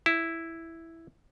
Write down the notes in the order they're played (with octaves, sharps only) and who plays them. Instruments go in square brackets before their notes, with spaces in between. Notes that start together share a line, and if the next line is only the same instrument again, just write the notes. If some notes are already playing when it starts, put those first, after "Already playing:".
[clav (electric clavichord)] E4